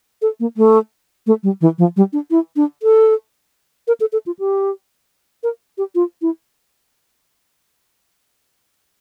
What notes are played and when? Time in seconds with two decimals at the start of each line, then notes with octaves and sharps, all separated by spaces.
0.22 A4
0.40 A#3
0.57 A3
1.26 A3
1.43 G3
1.61 E3
1.78 F3
1.96 G3
2.13 D4
2.30 E4
2.56 D4
2.83 A4
3.87 A#4
4.00 A4
4.12 A4
4.26 F4
4.39 G4
5.43 A#4
5.78 G4
5.95 F4
6.22 E4